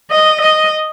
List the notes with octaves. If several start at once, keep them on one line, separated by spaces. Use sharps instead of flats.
D#5
D#5